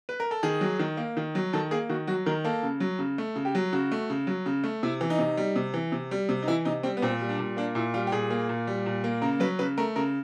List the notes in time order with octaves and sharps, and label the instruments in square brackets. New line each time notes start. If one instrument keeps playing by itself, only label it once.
[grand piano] B4
A#4
A4
D#3 G#4
F#3
D#3
A#3
D#3
F#3
D#3 A4
A#3 G#4
D#3 F#4
F#3 F#4
D#3 A#4
A#3 A4
C#3
F#3
C#3
A3
C#3
G4
F#3
C#3 F#4
A3
C#3
F#3
C#3
A3
C3 E4
E3
D#4
C3
G3
C3
E3
C3
G3
C3
D#4
E3 E4
C3 D#4
G3 C4
B3
A#2 C4
G3
D4
A#2
A#3 D4
A#2 E4
G3 F4
G4
A#2 G#4
A#3
A#2
G3
A#2
A#3
C#3 A#4
F#3 B4
C#3 B4
A3 A#4
C#3 A#4